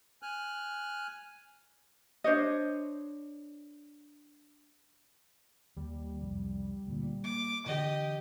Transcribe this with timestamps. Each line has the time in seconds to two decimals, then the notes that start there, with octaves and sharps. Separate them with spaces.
0.22 G#5 F6 F#6
2.24 D4 C5 C#5 D#5
5.77 D#2 G3
6.20 C2 F2
6.87 D2 A#2
7.24 A#3 D6
7.66 D3 E3 G4 D#5